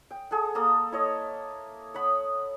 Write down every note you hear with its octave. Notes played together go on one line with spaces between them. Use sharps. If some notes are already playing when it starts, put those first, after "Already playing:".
G5
G#4 A4 F#5
A#3 A4 F5 D#6
E4 C#5 D#5
C#5 F#5 B5 D#6